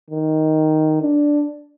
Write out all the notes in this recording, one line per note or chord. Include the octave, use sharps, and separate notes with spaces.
D#3
D4